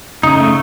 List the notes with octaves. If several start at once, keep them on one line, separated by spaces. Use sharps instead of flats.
C#3 D#4
A3